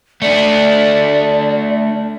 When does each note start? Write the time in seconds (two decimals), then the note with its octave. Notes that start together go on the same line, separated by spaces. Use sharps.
0.22 A3 D4 D5